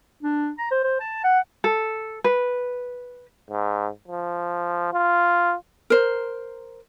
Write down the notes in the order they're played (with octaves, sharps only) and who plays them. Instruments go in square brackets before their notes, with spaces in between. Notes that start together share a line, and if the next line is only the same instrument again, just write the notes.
[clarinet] D4
A#5
C5
C5
A5
F#5
[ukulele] A4
B4
[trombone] G#2
F3
F4
[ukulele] A#4 C5